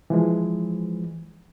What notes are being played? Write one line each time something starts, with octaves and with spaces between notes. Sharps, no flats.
E3 F3 G#3